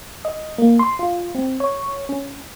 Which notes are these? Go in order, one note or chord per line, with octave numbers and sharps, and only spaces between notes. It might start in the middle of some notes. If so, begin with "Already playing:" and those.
D#5
A#3
C6
F4
C4
C#5
C#4